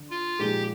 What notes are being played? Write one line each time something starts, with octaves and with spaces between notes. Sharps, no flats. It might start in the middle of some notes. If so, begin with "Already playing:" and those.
Already playing: D3
F4
A#2 F3 G#3 D#4 G4 G#4